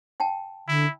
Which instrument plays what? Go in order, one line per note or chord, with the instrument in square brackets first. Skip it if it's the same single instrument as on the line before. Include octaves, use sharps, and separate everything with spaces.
[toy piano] F#5 G5 A5
[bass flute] D3 [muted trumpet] E4